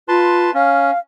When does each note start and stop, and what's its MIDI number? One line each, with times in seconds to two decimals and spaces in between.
0.08 0.53 65
0.08 0.51 71
0.08 0.51 81
0.08 0.51 84
0.54 0.91 61
0.54 0.99 77